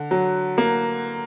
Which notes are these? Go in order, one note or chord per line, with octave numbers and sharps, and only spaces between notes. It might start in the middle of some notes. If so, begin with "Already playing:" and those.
Already playing: D3
F#3
A#3